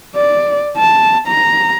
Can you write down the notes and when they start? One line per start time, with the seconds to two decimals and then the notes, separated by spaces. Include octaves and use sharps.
0.16 D5
0.77 A5
1.28 A#5